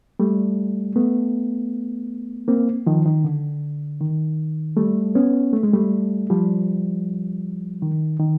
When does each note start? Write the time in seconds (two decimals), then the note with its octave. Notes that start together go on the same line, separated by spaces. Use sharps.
0.19 G3 A3
0.96 A3 B3
2.48 A#3 C4
2.86 D#3 F3
3.06 D#3
3.24 D3
4.00 D#3
4.77 G3 A3
5.15 B3 C#4
5.53 A3
5.63 G#3
5.73 G3 A3
6.30 F3 G3
7.82 D#3
8.20 D#3